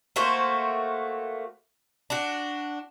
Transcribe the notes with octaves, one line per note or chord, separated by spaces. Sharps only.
A3 A#3 F#4 C5
D4 F#4